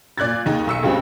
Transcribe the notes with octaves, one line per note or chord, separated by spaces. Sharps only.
A#2 D5 F#6 G#6 A6
D#2 D#4 G#4
B1 E6 C#7
C#2 G2 C#3 G3 G#3 C4